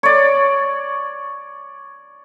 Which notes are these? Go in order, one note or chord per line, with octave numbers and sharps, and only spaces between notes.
C#5 D5